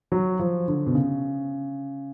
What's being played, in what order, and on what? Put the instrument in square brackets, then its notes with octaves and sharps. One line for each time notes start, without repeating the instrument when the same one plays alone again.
[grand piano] F#3
F3
D3
B2
C#3